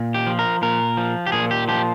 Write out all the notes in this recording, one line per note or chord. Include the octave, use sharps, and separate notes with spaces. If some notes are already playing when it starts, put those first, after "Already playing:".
Already playing: A#2
G4
F3
A#4
A#2 A#4
F3
G4
A#2 G#4
G4
F3 G4